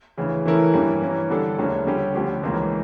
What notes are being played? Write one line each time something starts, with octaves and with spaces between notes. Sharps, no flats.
D2 C#3 E3
E3 A3 C#4 E4 A#4
G2 E3 G3 A#3 C#4
E3 A#3 C#4
D3 G3 D4 A4
D2 C#3 F3 A#3 C#4
D3 G3 C#4 G4
D2 D3 F3 C#4 G4
C#2 C#3 E3 A#3